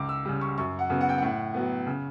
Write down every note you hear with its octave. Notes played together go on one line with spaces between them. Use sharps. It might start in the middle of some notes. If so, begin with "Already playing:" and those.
Already playing: C#2 D6
E6
C#3 G3
C#6
F#2 C#6
F#5
C#3 F#3 B3
F#5
G5
A2 F#5
F#3 B3
C#3